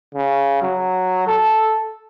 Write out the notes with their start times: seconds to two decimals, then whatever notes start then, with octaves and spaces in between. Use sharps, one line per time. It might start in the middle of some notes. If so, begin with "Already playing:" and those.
0.15 C#3
0.62 F#3
1.27 A4